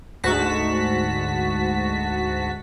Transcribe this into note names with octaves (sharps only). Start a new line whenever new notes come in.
D2 G#2 F#4 A5 B6